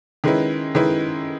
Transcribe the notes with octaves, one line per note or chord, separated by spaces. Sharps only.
D#3 G#3 C#4 E4 B4
D#3 G#3 C#4 E4 B4